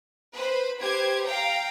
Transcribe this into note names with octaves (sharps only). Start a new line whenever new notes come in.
B4 C5 B5
G4 B4 C5 G#6
F5 G5 A#5